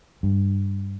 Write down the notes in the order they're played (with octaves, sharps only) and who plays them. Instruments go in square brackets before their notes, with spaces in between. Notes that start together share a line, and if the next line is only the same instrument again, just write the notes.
[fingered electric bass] G2